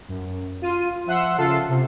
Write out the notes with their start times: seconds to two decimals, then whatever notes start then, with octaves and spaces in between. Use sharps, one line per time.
0.08 F#2
0.62 F4 D#7
1.06 F3 E5 F#5 C6 E6 F#6
1.38 C#3 F4 A4 E6 C7
1.69 C3